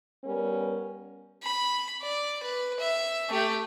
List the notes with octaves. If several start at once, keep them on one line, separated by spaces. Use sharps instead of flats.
G3 B3 C#4 A#4
B5
D5
B4
E5
A3 G4